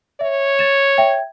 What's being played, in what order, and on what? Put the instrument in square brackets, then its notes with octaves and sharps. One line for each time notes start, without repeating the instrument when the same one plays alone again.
[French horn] C#5 [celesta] E5
[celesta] A6 E7
E5 G5 G#6